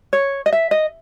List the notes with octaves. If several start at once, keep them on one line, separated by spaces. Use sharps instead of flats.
C#5
D#5
E5
D#5